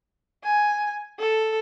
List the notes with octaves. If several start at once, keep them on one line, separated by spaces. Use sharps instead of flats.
G#5
A4